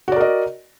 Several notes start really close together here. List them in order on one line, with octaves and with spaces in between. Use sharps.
F#4 D5 A#4 D#5